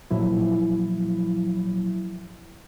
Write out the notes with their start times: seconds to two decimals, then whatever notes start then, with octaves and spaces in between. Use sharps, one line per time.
0.10 A#2 F3 F#3 E4